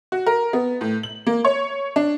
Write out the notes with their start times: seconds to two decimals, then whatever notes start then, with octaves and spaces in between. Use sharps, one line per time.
0.12 F#4
0.26 A#4
0.53 B3
0.81 A2
1.03 F#7
1.27 A#3
1.45 C#5
1.96 D4